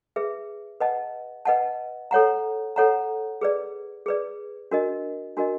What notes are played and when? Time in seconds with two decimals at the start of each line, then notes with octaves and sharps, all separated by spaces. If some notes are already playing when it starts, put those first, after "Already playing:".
0.16 G#4 B4 E5
0.80 B4 D#5 F#5 A5
1.45 B4 D#5 F#5 A5
2.11 A4 C#5 F#5 A#5
2.76 A4 C#5 F#5 A#5
3.41 G#4 B4 D5
4.06 G#4 B4 D5
4.71 D4 F#4 A#4 D#5
5.37 D4 F#4 A#4 D#5